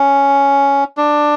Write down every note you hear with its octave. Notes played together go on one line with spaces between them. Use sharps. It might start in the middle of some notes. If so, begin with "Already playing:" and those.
Already playing: C#4
D4